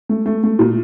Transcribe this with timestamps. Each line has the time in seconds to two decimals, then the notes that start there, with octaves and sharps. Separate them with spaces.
0.09 A3
0.26 A3
0.44 A3
0.59 A#2